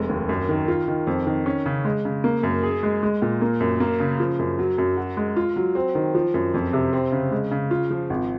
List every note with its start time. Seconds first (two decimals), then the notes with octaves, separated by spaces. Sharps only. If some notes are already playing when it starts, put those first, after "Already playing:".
Already playing: F1 G#3
0.09 D#2
0.29 F#2
0.49 D#3
0.68 F4
0.88 D#3
1.07 F2
1.27 D#3
1.46 C#4
1.66 C#3
1.85 G#3
2.05 C#3
2.24 A#3
2.43 F#2
2.63 G#4
2.83 G#3
3.03 G#3
3.22 A#2
3.41 A#3
3.60 F#2
3.80 A#3
4.00 C#3
4.20 F3
4.39 F#2
4.59 F#3
4.78 F#2
4.97 F#4
5.17 G#3
5.36 F4
5.56 F#3
5.75 C4
5.95 D#3
6.15 F3
6.34 F#2
6.54 F2
6.73 C3
6.93 C4
7.12 C#3
7.31 G#3
7.51 C#3
7.71 F4
7.91 F3
8.10 G#1